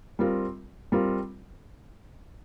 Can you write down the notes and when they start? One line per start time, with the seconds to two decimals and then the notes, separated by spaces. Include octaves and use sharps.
0.19 G3 C4 F4 A#4
0.92 G3 C4 F4 A#4